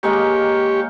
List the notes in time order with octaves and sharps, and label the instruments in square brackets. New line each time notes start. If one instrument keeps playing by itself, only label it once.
[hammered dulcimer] D#3 G#3 A#3 [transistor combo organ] G4 C#5